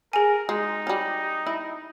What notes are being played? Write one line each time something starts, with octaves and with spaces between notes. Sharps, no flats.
G#4 A#4 G#5
G#3 D#4
G3 C#4
E4